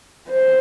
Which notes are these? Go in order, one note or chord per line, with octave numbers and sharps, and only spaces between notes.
C5